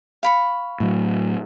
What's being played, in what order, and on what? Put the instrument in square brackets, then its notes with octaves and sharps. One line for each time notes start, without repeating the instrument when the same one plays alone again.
[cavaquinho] F5 B5 C#6
[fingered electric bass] A2 F#3